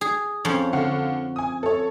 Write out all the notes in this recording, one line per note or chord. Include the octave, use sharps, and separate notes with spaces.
G#4
F2 F3 C#4
D3 F5 F#5
G#5 D#6
A4 C#5